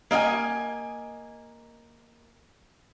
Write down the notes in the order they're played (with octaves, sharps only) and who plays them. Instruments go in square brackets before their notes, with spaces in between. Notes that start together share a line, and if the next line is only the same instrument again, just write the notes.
[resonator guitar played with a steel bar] A#3 D#5 E5 G#5